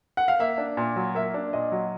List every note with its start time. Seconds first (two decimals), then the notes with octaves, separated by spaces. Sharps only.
0.17 F#5
0.28 F5
0.39 A#3 E5
0.58 D4
0.77 A#2
0.96 F#3
1.15 A#3 E5
1.34 D4
1.53 A#2 D#5
1.72 F#3